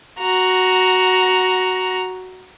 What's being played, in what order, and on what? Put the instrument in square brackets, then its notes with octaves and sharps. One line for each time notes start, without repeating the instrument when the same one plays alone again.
[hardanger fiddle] F#4 A#5